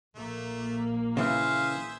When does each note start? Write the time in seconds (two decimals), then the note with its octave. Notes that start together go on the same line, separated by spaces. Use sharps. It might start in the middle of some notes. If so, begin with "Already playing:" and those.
0.15 A#1 A3 A#3
1.17 C#3 E3 G#4 C5 E5 F5